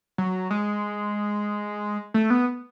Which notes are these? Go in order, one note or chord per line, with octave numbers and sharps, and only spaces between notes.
F#3
G#3
A3
B3